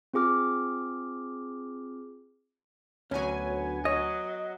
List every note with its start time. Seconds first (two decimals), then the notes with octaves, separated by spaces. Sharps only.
0.14 C4 F4 G#4 D6 F6
3.11 D2 F#3 B3 C#4 G#5
3.85 F#3 C#5 D#5